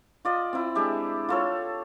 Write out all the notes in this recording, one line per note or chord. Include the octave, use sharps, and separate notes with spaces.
F4 D5 D#5
C4 E4
G#3 D4 G4 E5
F4 A4 C#5